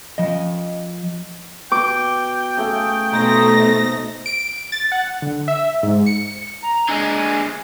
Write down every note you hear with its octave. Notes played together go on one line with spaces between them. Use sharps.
F3 D#5
B2 G5 D6
C#3 A3
B2 A3 D#4 C5 C6 A#6
D7
A6
F#5
D3
E5
G#2
C#7
A#5
D3 G#3 G#5